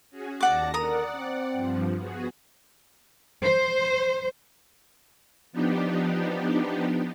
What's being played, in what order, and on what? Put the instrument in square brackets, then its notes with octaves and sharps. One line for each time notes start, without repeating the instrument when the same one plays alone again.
[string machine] C#4 F#4 G#4
[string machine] D#2 A5 A#6 [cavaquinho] D5 F#5 D6
[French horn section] D3 A#4 [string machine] D5 F#5 [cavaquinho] A#5 D#6
[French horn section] C4
[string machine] G2 F3
B3 F#4 G#4
[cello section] C5
[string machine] F3 B3 D4 D#4 G4